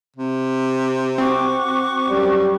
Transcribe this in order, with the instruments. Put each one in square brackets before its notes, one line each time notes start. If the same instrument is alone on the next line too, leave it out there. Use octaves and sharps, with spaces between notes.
[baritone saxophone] C3
[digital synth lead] C4 [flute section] F#4 C#6 D6
[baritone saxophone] F#2 [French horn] G3